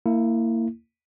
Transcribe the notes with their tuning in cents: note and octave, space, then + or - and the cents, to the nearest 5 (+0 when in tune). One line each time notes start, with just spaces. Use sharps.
A#3 -25 E4 +0